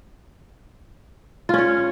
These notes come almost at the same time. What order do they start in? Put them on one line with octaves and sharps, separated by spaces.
F4 C#4 C#5